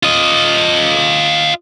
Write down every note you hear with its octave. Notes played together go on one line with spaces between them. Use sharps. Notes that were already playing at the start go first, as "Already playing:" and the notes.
F4 D#5